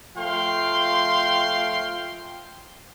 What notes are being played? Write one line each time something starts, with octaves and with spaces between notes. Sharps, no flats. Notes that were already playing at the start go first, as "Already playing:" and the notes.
F3 A3 F5 G5 C6